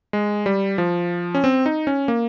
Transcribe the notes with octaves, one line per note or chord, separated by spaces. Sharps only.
G#3
G3
F3
C#4
C4
D#4
C#4
A#3